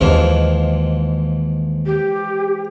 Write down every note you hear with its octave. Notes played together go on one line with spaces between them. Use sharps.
D#2 G#2 E3 F3
G4